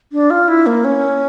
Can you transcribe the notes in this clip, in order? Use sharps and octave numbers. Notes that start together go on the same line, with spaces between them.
D4
F4
E4
A#3
C#4